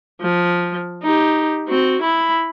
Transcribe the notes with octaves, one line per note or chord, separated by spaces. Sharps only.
F3
D#4 G4
C4 F#4
E4 B5